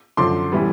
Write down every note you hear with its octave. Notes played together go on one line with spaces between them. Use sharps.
F#2 D3 F3 C6 D6
A2 E3 G3 B3